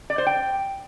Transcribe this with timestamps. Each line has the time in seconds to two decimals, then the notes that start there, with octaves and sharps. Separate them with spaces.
0.10 D5
0.18 C5
0.27 G5